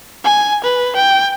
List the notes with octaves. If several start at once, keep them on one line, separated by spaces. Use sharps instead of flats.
G#5
B4
G5